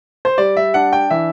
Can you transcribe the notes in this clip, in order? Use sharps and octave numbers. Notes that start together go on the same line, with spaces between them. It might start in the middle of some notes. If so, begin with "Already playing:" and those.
C5
G3 D5
E5
D4 F#5
G5
E3 E5